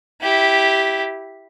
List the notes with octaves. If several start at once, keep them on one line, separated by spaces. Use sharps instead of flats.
E4 G4